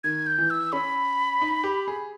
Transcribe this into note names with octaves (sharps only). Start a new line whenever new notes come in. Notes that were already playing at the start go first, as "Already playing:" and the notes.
D#3 G#6
G6
E3
E6
C#4 B5
D#4
G4
G#4